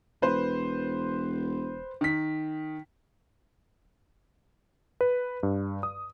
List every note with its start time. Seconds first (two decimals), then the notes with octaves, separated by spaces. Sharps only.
0.22 E1 B4 C5
2.01 D#3 B6
5.01 B4
5.43 G2
5.83 D#6